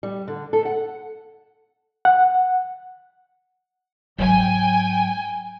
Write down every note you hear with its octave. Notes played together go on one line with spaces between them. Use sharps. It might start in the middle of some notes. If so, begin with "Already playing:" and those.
G3
D3
A4
F#5
F#5
G#2 F#3 G5 G#5